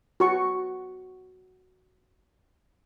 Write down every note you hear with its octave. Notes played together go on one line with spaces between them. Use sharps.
F#4 C#6